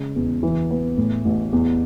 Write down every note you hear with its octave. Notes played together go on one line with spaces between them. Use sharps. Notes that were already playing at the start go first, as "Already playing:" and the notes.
Already playing: C#3 G#3
E2
E3
B3
A2
A1
E2